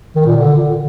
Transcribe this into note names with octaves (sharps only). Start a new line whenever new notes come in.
D#3
A#2
D3